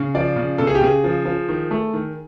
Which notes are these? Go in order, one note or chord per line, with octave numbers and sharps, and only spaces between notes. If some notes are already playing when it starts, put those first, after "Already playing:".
Already playing: C#3
F3 D5
C#3
C#3 A4
G#4
G4
C#3 G#4
F3
F3
D#3
A3
D#3